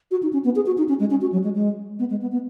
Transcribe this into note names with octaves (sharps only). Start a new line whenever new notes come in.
F#4
D#4
C#4
B3
G#4
F#4
D#4
C#4
G#3
C#4
F#4
F#3
G#3
G#3
B3
G#3
B3
B3